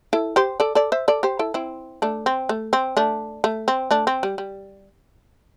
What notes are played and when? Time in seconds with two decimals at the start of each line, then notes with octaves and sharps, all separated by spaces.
0.13 E4 A4
0.36 G4 C5
0.60 A4 D5
0.75 A4 D5
0.92 C5 E5
1.08 A4 D5
1.23 G4 C5
1.39 E4 A4
1.54 C4 E4
2.02 A3 D4
2.26 C4
2.49 A3
2.73 C4
2.97 A3 D4
3.44 A3
3.68 C4
3.91 A3 D4
4.07 C4
4.23 G3
4.38 G3